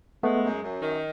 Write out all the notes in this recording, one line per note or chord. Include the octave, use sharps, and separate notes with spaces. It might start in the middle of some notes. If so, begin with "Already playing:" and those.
G#3 A3 B3
F#2
F#2
D#3